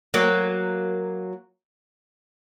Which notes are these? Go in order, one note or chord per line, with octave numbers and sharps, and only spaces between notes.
F#3 A#3